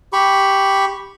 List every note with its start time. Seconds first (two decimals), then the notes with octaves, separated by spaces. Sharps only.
0.13 G4 B5 C#6